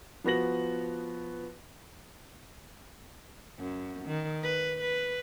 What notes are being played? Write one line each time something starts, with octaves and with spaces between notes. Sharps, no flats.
F3 B3 F#4 A#6 F#7
F#2
D#3
B4
B4